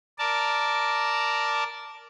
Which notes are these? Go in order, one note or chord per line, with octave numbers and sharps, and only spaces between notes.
A#4 D5 A5